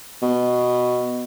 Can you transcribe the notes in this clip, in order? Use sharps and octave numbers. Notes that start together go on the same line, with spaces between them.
B2